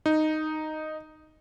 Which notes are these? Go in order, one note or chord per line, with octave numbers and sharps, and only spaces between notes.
D#4